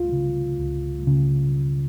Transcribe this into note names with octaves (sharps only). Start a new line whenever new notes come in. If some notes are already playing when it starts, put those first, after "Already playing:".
Already playing: C#2 F4
C#3
C#2
C#3